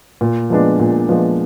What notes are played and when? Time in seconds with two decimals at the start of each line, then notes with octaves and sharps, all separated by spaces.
0.21 A#2
0.50 F3 G#3 B3 D4
0.80 A#2
1.09 F3 G#3 B3 D4